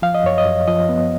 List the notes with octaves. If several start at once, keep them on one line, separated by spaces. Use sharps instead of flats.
F3 F5
D#5
F#2 C#5
D#5
F#2
F3 D#5
B3